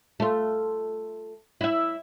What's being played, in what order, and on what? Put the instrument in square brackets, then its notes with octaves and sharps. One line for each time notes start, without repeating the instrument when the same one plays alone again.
[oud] A3 F4
E4 E5